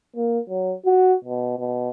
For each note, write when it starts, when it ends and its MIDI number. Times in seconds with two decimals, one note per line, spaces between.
0.16 0.39 58
0.49 0.74 54
0.86 1.15 66
1.24 1.58 47
1.59 1.90 47